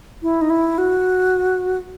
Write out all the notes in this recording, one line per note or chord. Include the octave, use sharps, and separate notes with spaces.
E4
D#4
E4
F#4